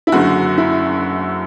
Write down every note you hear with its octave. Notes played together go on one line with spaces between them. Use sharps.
E4
F#1 F#2 D3 F#4
E4